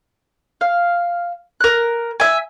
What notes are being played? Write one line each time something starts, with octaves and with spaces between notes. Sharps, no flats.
F5
A#4 F#6
E5 G#5